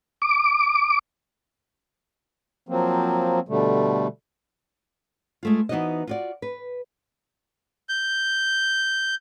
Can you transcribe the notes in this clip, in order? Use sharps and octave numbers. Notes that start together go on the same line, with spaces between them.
D6
F3 F#3 A#3 C4
B2 D3 G3 A3
G#3 A3 F4
E3 B3 D#4 F#4 C5 D#5
F4 F#4 D5
B4
G6